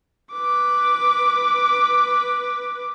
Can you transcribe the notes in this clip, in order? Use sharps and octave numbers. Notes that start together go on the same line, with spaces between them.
B4 D6